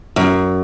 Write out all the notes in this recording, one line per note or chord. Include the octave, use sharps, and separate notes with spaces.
F#2